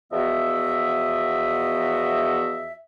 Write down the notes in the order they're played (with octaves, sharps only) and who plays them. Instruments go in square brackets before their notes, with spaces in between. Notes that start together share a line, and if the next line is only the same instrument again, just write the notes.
[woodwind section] E2 F3 B3 F#4 D#5 E5